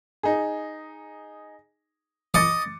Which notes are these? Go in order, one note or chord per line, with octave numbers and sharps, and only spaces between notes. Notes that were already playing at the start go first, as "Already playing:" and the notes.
D#4 G#4
D#5 D6 A6 C#7